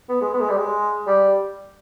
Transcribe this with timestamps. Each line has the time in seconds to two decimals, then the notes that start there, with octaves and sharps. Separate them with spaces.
0.09 B3
0.21 G#3
0.34 B3
0.41 G#3
0.49 G3
0.57 G#3
1.07 G3